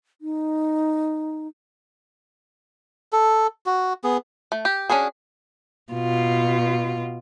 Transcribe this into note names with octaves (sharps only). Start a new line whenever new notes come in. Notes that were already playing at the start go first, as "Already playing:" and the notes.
D#4
A4
F#4
B3 G#4
A3
G4
C#4 D4 F#4 G#4
B2 F4